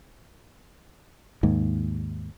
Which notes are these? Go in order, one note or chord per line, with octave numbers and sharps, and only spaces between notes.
D#2 G#2